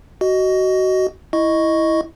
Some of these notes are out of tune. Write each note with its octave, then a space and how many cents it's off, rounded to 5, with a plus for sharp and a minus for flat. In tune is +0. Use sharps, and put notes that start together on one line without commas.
F#4 +20 D#5 +0
E4 +0 D#5 +0 C#6 +0